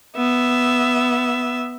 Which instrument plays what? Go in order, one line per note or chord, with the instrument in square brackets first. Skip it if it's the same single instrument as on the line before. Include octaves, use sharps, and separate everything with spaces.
[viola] B3 E5